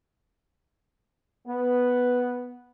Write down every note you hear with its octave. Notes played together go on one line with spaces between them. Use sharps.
B3